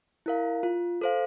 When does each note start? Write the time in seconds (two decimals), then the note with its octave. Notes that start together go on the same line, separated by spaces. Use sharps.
0.26 E4 A#4 F5
0.63 F4
1.01 A4 C5 F5